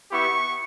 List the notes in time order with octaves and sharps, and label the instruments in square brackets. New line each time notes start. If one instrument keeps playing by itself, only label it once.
[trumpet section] B3 E4 G4 C#6